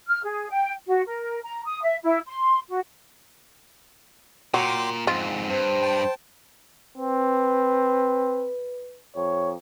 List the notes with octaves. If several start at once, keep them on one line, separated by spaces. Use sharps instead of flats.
F6
G#4
G5
F#4
A#4
A#5
D#6
E5
E4
C6
F#4
A#2 F#3 G5 C6 D6
F2 G#2 C4 F4
G2 C5
G5 A5
C4 B4
F2 C#5